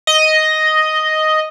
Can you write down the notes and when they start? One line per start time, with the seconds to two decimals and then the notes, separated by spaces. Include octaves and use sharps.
0.07 D#5